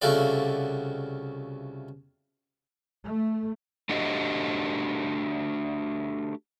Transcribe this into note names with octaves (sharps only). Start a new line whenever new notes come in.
C2 C#3 A3 F4 F#4 D5
A3
A3 D4 F#4 G4 D#5